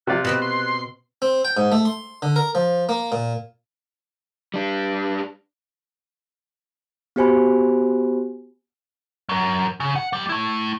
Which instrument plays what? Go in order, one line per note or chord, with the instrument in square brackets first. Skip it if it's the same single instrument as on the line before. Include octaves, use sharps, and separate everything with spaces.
[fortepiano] C3 F4 D5 [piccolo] F#6
[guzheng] B2 B3 C4
[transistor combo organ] C6
[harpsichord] C4
G5
G#2
A3
C6
D3
A#4
F3
A#3
A#2
[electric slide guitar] G3 D4
[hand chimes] B3 F#4 G4 C5 G#5 B5
[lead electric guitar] F#3 A#4
C#3
F#5
D#2 G3
A3 E4